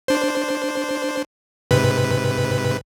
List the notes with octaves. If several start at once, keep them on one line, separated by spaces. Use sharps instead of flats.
D4 C5
G#2 C3 B4